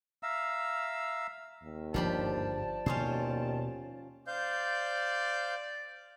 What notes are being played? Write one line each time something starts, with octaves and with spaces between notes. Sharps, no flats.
E5 F5 A#5 E6
D#2
G1 G#2 F3 D4 G4 D5 A5 B5
D#2 B2 C#4 F4 C5
C5 D5 F5 G6